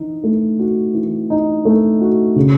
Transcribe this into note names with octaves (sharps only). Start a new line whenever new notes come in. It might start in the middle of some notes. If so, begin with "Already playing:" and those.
Already playing: E3 D#4
A3
F#4
E3
D#4
A3
F#4
C#3